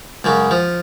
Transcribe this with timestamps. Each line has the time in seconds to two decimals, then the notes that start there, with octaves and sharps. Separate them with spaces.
0.24 C#2 F#2 C#3
0.51 F3